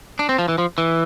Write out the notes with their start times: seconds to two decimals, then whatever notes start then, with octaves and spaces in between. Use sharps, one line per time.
0.19 D4
0.29 C4
0.38 F3
0.48 E3
0.58 F3
0.78 E3